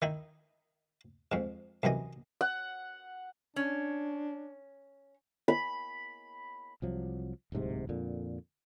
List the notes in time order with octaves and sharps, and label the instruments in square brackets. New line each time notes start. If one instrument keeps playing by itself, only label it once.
[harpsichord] D#3 D#4 E4
F2 G#2
C2 F#2 E3 D#5
[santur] F#5
[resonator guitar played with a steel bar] C#4 [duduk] D4
[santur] B5
[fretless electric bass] C2 F3 F#3
D1 C2 G#2 C3
F2 A#2 D3